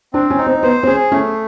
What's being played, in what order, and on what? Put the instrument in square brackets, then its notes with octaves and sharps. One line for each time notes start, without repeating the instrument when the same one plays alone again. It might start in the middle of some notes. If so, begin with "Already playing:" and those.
[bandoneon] C4 [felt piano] D4
[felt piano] C#4
[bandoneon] D#4
[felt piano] C4
[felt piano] B3 [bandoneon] C5
[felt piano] C4
[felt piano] C#4 [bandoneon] G#4
[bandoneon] A3 [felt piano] C#4